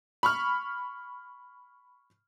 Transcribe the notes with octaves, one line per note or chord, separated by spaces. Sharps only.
B5 C#6 F6